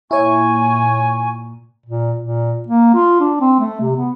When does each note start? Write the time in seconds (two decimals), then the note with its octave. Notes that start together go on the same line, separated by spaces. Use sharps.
0.11 A#2 E4 C#5 G#5 C#6
1.86 A#2
2.19 A#2
2.68 A#3
2.95 F4
3.20 D4
3.41 C4
3.60 A3
3.81 C3
3.96 B3